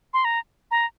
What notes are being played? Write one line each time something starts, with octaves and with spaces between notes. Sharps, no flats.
C6
A#5
A#5